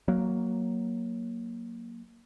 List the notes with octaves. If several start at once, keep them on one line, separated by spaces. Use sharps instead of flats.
F#3 A#3